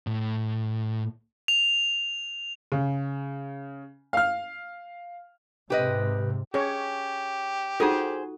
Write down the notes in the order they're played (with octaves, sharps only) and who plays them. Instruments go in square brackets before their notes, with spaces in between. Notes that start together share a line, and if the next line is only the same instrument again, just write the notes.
[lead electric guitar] A2
[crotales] F7
[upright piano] C#3
F5 F6
[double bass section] G#2 C3 [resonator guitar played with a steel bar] G4 B4 D#5
[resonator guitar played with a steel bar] C#4 [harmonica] G4 [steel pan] G#4 C#5
[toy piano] D#4 F4 A4 [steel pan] F#4 D#6 [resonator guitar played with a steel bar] G#4 C5